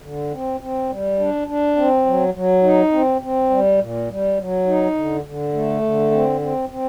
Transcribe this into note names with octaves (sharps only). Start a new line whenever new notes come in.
D3
C4
C4
G3
D4
D4
C4
F#3
F#3
D#4
C4
C4
G3
A#2
G3
F#3
D#4
D3
D3
A3
D3
C4
C4
C4